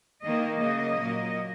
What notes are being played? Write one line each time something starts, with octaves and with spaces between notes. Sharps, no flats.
D#3 A#3 D#5
C#3 F#3 A#3 D#5
A#2 F#3 A#3